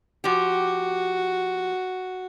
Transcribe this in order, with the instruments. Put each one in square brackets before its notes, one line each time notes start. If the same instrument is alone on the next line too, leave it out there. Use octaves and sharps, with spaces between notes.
[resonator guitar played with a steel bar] F3 G4 [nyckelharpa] F#4